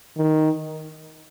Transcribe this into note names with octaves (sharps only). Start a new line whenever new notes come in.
D#3